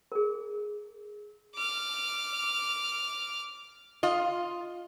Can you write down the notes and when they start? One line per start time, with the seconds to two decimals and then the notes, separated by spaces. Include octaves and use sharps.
0.12 G#4 A#4
1.56 D6 F6
4.03 F4 D#5